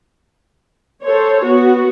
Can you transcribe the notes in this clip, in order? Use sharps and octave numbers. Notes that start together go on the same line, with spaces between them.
A4 C5 C#5
B3 F#4